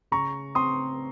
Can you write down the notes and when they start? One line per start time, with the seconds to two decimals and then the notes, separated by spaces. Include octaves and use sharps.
0.12 C#3 A#5 C#6
0.55 C4 C6 D#6